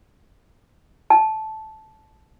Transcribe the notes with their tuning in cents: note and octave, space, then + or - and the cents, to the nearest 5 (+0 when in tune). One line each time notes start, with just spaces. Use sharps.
A5 -10